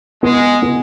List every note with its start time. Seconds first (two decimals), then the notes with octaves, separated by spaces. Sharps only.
0.23 G#3 B3
0.62 B3